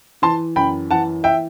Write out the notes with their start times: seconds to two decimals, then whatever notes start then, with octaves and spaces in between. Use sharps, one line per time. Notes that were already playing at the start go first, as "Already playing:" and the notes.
0.22 E3 A5 C6
0.56 F#2 G5 B5
0.90 E3 F#5 A5
1.24 E5 G5